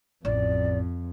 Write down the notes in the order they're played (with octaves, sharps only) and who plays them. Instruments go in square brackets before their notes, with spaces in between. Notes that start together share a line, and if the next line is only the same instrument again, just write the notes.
[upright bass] A1 [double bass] F2 [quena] D5